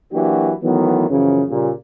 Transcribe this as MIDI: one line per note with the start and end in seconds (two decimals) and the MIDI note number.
0.12 0.52 52
0.12 0.52 54
0.12 0.52 58
0.12 0.52 62
0.12 0.52 66
0.12 0.52 67
0.63 1.08 51
0.63 1.08 52
0.63 1.08 54
0.63 1.08 57
0.63 1.08 59
1.09 1.42 42
1.09 1.42 49
1.09 1.42 52
1.09 1.42 53
1.09 1.42 61
1.49 1.70 46
1.49 1.70 49
1.49 1.70 55